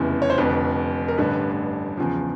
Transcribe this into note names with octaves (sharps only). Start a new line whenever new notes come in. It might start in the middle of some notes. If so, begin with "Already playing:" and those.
Already playing: F1 E2 C#3 E3
C#5
C5
F1 F2 D3 B4
A#4
A1 G2 D3 B4
E2 C#3 F3